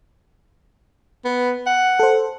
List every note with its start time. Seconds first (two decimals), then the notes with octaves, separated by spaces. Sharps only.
1.25 B3
1.67 F#5
2.00 A4 C5